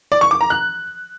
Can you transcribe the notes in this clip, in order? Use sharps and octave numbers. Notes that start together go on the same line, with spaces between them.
D5
C#6
D6
A#5
F#6